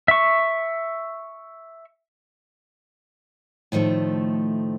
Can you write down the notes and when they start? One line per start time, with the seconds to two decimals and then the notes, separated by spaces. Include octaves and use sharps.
0.08 E5 C#6
3.72 A2 D#3 F3 A3